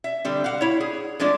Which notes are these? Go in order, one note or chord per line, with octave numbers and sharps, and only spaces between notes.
E5
D3 G3 C4
F5 F#5
E4 C#5
G#4
F3 G#3 A3 D4 D5